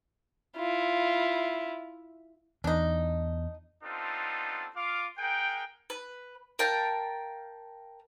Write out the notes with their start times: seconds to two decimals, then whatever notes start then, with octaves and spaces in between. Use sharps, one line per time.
0.57 E4 F4
2.64 E2 D4 D#4
3.83 B3 C4 D4 D#4 F4 A4
4.75 F4 F5 D6
5.18 G#4 A#4 F#5 G5
5.90 B4
6.59 A#4 F5 G5 A5